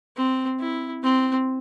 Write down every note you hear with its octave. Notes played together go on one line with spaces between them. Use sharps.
C4
E4
C4